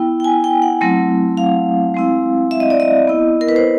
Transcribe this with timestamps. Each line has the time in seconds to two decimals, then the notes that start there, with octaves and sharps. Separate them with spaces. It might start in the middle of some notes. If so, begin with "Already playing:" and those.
Already playing: B3 E4 G5
0.20 G5
0.24 G#5
0.44 G5
0.62 F#5
0.81 F#3 A3 C4 E4
1.37 F5
1.94 G#3 C4 E4
2.51 E5
2.60 D#5
2.70 D5
2.80 D#5
3.08 B3 E4
3.41 A#4
3.49 B4
3.56 C5